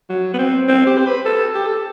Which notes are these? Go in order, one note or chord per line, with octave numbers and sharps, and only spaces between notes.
F#3
B3
C4
C4
G4
C5
B4
A4
G4
A4